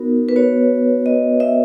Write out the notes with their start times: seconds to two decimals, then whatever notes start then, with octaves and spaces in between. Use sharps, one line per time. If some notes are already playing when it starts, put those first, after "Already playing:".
Already playing: B3 D#4 F#4 A#4
0.29 B4
0.36 B3 F#4 C#5
1.06 D#5
1.40 E5